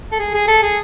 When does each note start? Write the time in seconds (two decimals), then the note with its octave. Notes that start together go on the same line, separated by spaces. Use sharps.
0.12 A4
0.20 G#4
0.34 G#4
0.48 A4
0.63 G#4